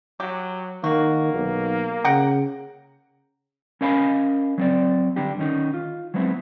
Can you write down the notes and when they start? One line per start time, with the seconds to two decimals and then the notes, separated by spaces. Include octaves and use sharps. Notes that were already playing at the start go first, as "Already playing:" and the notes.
0.20 F#3 G4
0.84 D#3 A#3 F#4
1.34 B1
2.05 C#3 F#5 G5 A#5
3.81 C#4 A#4 D#5 F5 G#5 B5
4.58 F#3 C4 D5
5.16 D3 G3 D4 G4
5.39 D#3 C#4 D#4
5.74 F4
6.14 F#3 G#3 B3 C4 E4